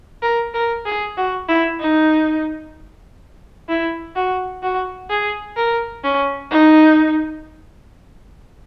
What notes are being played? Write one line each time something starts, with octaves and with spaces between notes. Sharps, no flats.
A#4
A#4
G#4
F#4
E4
D#4
E4
F#4
F#4
G#4
A#4
C#4
D#4